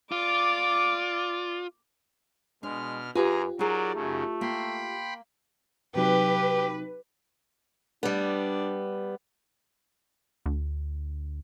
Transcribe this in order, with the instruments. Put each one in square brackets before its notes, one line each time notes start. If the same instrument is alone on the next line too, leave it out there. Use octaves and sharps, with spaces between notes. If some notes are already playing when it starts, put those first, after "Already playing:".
[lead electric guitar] F4 [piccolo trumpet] D5 [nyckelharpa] D6
[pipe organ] B2 F6 [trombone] G#3 [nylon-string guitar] D4
[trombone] F#2 [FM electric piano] F4 G4 [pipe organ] G#4 A#5 [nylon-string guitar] B4 G#5
[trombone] F#3 [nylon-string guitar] D#4 G#4 [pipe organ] A#4 D5
[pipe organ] F#2 C#3 [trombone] A3
[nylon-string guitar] A#3 [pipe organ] G5 B5 C6
[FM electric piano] C3 F#3 D#4 [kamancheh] G4 [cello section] B4
[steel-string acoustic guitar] G3 B3 [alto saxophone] D4
[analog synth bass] D2